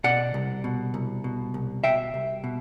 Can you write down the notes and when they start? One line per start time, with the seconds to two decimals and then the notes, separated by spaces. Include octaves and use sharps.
0.04 B2 D5 F#5
0.34 C2
0.64 B2
0.94 C2
1.24 B2
1.54 C2
1.84 B2 E5 G5
2.14 C2
2.44 B2